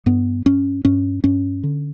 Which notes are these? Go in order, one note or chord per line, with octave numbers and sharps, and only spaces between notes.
G2 B3
G2 C#4
G2 C#4
G2 C#4
D3